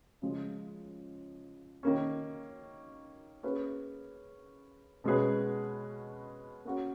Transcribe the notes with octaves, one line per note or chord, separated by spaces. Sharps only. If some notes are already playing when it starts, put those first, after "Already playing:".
C#3 F3 G#3
D#3 A#3 C#4
A#3 C#4 G#4 B4
B2 G#3 C#4 G#4 B4
A#3 C#4 F#4 A#4